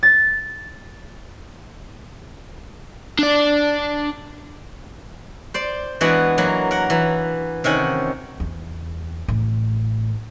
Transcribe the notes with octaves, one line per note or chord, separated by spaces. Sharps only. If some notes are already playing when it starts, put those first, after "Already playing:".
A6
D4 D5
C5 D5
E3 G#3 B3 D4 F#4 D5
E3 F#3 A#3
A#4 F#5
E3
C3 D#3 C#4 F#5
E2
A1